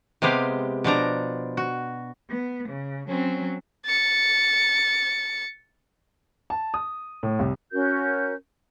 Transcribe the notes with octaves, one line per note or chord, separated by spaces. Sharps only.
C3 G#3 B3 G4 F5
B2 F3 D4 A#5
F#4
B3
C#3
F#3 C4 C#4
A6 C#7
A5
D#6
A2
C2
C#4 F#4 A#4 G6